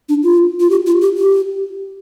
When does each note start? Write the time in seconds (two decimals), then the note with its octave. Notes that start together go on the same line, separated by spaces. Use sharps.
0.09 D4
0.23 F4
0.60 F4
0.70 G4
0.86 F4
1.01 G4
1.17 G4